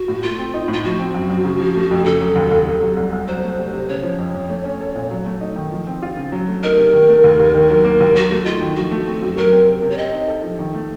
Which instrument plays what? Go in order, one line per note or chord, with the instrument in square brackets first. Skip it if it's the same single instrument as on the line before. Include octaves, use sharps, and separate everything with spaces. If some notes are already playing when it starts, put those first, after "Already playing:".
Already playing: [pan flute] F#4
[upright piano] A2
[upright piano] A3 [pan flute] F4
[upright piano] C4
D#4
[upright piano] A2 [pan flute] F4
[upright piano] F3 [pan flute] F#4
[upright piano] C4
F#2
F#2
C#3
F3
A3
F2
[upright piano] C#3 [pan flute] A4
[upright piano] F#3
D#2
D#2
C3
F#3
C2
C2
[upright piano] F#3 [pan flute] C5
[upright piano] A3
C3
C3
[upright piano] C#3 [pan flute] C#5
[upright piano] F3
F2
F2
A3
C#4
A4
A#2
F#3
A3
D#4
D#3
F3
C4
F4
C#3
F#3
A3
[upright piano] D#4 [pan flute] A#4
[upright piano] C3
D#3
A3
D#2
D#2
D#3
F#3
A#3
D#2
[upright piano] F#3 [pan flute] F#4
[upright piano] A3
[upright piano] D#4 [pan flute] F4
[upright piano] D#3
[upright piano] F3 [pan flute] F#4
[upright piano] A3
C4
F#2
[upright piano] F#3 [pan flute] A#4
[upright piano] C4
C3
C3
[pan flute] C#5
[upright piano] C4 [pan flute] D#5
[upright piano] D#4
A4
F3
D#3
A3